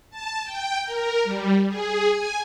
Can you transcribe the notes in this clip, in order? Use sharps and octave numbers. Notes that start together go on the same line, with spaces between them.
A5
G5
A#4
G3
G#4
G#5